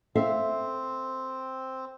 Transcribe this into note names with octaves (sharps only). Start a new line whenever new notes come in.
C4 A4 E5 F5